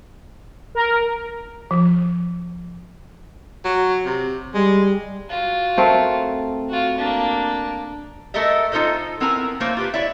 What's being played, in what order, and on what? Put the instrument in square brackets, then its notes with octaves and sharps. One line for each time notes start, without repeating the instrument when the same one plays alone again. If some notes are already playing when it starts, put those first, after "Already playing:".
[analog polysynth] A#4
[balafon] F3
[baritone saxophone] F#3
C3
[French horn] G3 [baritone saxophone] G#3
[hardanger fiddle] F4 F#4
[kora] A3 C4 A#4
[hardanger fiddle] F4 F#4
A#3 D4
[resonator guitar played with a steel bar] A3 A4 A#4 D#5 E5
D#4 F4 A4 C5 D#5
B3 C4 E4 A#4 G#5 A#5
A3 A#3 C5 C#5
F4 G4 B4
E4 C#5 D5 E5